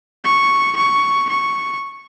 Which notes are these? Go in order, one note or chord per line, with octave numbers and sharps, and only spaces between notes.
C#6
C#6
C#6